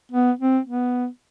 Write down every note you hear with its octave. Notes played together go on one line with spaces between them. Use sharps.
B3
C4
B3